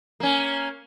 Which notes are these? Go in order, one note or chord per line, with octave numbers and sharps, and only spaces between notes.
A#3 C#4